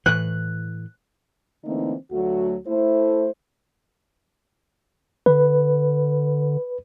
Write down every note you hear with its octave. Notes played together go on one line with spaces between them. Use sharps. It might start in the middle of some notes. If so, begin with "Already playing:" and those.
A2 E3 F#6
D3 E3 A3 A#3 C4 D#4
D2 F#3 A3 F#4
A3 E4 C5
D3 B4